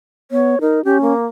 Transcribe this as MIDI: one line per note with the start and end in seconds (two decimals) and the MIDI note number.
0.31 0.55 59
0.31 0.59 73
0.61 0.82 63
0.61 0.79 70
0.85 1.13 61
0.85 1.01 67
1.01 1.26 58